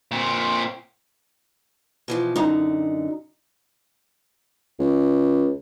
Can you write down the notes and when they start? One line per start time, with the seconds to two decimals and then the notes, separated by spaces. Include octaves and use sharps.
0.12 A#2 C4
2.08 B2 E3 F3
2.36 F#2 D3 D#4 A#5
4.79 C#2